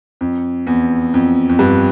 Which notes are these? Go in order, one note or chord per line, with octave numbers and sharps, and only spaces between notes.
F2
E2
F2
F2
G2